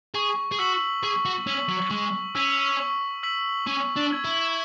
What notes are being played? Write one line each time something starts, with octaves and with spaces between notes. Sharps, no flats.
G#4 C#6
G#4
F#4 E6 B6 F#7
G#4 C#6
F#4
C#4 E6 B6 F#7
F#3
G#3 C#6
C#4 E6 B6 F#7
C#6
E6 B6 F#7
C#4 C#6
D4
E6 G#6
E4